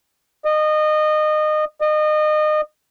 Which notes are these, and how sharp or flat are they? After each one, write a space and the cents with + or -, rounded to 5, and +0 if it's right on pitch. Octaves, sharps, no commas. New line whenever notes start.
D#5 -25
D#5 -30